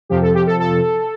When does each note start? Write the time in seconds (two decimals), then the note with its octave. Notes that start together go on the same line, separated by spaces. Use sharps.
0.09 F2 C3 F3 G4
0.22 A4
0.35 G4
0.47 A4
0.60 A4